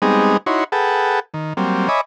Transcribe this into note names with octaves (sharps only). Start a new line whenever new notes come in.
G3 G#3 B3 C4 D#4 G#4
D#4 E4 F#4 C#5 C6
G#4 A4 B4 F#5 G5 A5
D#3
F#3 G3 A#3 C4
C#5 D#5 E5 G#5 B5 D6